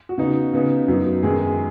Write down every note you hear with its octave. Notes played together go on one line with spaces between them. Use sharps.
F#4
C#3 B3 D#4
C#3 B3 D#4
F#2 F#3 B3 D#4
F#2 D#3 G#3 B3 D#4 G#4
G#4